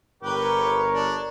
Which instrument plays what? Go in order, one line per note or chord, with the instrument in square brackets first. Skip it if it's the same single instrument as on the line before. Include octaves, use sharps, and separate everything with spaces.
[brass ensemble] G1 A#4 C#5 [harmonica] G4 B4
[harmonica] D4